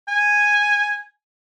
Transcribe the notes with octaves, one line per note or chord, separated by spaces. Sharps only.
G#5